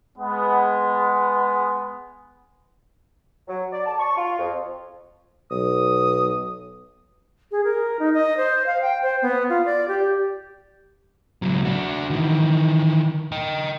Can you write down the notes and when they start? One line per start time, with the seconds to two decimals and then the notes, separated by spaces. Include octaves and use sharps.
0.18 G#3 B3
3.48 F#3
3.72 D5
3.86 A5
3.99 C#6
4.17 F4
4.39 F2
5.51 B1 D#6
7.51 G#4
7.64 A#4
7.99 D#4
8.14 D#5
8.37 C5
8.66 F5
8.81 G5
9.02 C5
9.22 B3
9.49 F4
9.65 D5
9.88 G4
11.42 C#2 F#3
11.65 D4 F#4
12.10 D#3 E3
13.32 D#5 G5